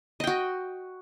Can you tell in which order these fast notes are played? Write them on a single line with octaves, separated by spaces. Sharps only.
D#5 G5 F#4